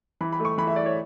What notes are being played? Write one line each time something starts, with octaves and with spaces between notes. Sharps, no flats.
E3 B5
B5
A3
C#6
E3 B5
E5
E4 D5
C#5